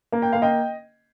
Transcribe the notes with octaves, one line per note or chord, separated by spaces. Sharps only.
A#3
G5
A#3 F5
D#5 G5